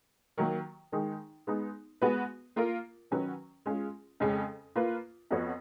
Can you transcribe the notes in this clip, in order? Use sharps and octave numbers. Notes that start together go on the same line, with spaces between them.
D#3 F#3 A#3
D#3 G#3 D#4
G#3 B3 D#4
G#3 B3 F#4 B4
A#3 F4 A#4
D#3 F#3 C#4 F#4 B4
G#3 C#4 F4 G#4
F2 C#3 G#3 C#4
A#3 F4 B4
F2 F3 B3 F#4 C#5